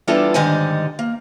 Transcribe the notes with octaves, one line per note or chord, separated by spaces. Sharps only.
E3 G3 B3 D4 F4 A4
G#2 D3 D#3 G3 D#5 G#5
A#3